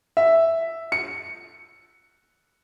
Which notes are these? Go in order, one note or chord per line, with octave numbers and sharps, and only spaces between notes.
E5
C#7